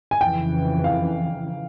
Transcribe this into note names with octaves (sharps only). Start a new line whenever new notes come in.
G#5
F2 C#3 E3 G5
F5